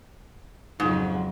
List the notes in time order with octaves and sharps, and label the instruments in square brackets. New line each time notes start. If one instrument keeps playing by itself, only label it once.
[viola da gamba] F2 C#3 F#3 [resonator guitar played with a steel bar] G#2